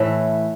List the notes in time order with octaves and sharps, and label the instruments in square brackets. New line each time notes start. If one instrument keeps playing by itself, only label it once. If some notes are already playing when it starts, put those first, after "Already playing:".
Already playing: [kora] A2 E3 A3